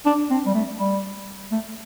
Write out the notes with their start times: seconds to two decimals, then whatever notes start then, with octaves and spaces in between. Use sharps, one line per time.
0.06 D4
0.30 C4
0.46 G3
0.55 A3
0.79 G3
1.52 A3